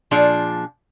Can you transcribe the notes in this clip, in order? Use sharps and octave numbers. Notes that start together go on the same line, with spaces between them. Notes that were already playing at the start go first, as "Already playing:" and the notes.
A#2 F3 D4 G#4